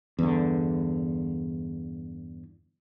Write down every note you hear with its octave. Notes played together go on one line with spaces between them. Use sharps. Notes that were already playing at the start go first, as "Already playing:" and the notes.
E2 G2 D3